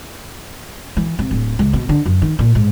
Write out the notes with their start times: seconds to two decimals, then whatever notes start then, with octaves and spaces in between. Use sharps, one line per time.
0.97 E3
1.19 C3
1.31 D1
1.59 C#2
1.73 B2
1.89 D3
2.06 F#2
2.22 D#3
2.39 A#2
2.55 G#2